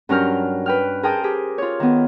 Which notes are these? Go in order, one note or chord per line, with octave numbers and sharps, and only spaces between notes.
G2 F#3 C#4 A#4 F6 G6
B4 G5 F6
G#4 A#4 C5 G5 A5 D#6
G4 G#4
F4 C#5
D#3 B3